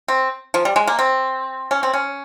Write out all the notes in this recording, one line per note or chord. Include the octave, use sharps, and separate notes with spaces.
C4
F3
G3
G#3
A#3
C4
C#4
C4
C#4